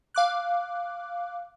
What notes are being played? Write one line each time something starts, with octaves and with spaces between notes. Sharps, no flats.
F5 D6 F#6